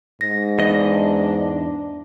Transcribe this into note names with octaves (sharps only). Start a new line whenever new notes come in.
G#2 A#6
E2 D4 D#5